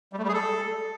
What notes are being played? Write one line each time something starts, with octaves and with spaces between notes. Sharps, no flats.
G3
A3
G3
G#4
A4